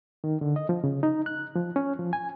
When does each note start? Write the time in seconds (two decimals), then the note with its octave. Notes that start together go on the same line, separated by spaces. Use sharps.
0.24 D#3
0.41 D3
0.56 D#5
0.69 F3
0.84 C#3
1.03 D#4
1.26 F#6
1.56 F3
1.76 C#4
1.99 F3
2.13 G#5